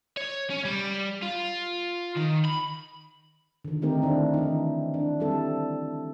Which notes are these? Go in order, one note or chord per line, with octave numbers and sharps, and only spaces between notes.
C#5
C#4
G3
F4
D#3
B5
D3 D#3
A3 C4 D#4 G4 A#4
D#3 A3 D4 E4
E3 D#4
D4
G3 C4 E4 A4